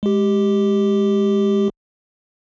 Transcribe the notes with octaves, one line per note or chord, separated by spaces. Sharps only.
G#3 G4